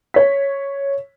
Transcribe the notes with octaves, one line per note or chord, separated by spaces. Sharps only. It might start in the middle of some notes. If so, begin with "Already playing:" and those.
C#5 B6